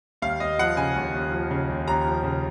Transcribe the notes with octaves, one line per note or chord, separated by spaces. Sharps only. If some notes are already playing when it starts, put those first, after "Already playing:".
D#2 F5
D#2 D#5
F3 F#5
C#3 G#5
D#2
D#2
F3
C#3
D#2
D#2 A#5
F3
C#3